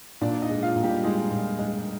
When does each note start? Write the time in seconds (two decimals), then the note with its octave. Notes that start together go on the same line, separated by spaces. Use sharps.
0.21 A#2 D4 D5
0.42 D#4 D#5
0.49 G#3
0.63 F4 F5
0.76 A#2
0.83 G3 G4
1.03 G#3 D#4 G#4
1.31 A#2
1.59 G#3